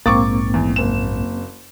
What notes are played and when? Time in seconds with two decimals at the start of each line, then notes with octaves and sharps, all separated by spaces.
0.06 A#1 G#2 A#3 C4 C#6 D6 A6
0.54 E2
0.76 F#1 E7